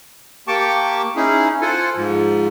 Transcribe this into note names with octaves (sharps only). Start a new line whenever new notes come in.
A#3 G4 G5 A5 C#6 D6
C#4 D#4 E4 G#4
F4 A4 C5 F#5 G#5
G#2 F3